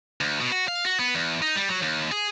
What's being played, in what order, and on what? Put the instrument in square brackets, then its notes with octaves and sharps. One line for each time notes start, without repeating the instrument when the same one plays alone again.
[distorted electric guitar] D2
B2
F#4
F5
F#4
B3
E2
D#4
G3
F#3
D#2
G#4